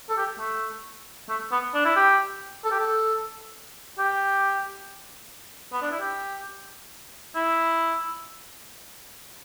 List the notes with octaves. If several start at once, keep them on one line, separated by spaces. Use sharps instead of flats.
A4
G4
A3
A3
B3
D4
E4
G4
A4
G4
A4
G4
B3
D4
E4
G4
E4